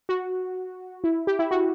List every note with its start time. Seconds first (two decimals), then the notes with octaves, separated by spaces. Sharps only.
0.09 F#4
1.04 E4
1.27 G4
1.39 E4
1.51 F#4